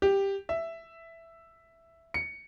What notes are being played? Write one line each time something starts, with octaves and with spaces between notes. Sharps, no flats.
G4
E5
C#7